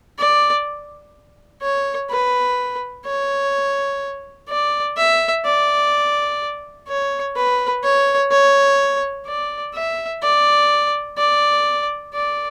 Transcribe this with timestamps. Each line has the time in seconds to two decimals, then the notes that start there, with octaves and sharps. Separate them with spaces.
0.19 D5
1.62 C#5
2.10 B4
3.06 C#5
4.49 D5
4.97 E5
5.45 D5
6.88 C#5
7.35 B4
7.84 C#5
8.31 C#5
9.27 D5
9.74 E5
10.22 D5
11.18 D5
12.13 D5